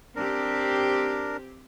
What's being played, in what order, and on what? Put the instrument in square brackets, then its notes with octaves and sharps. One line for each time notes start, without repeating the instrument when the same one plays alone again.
[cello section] C4 G4 [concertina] D4 A#4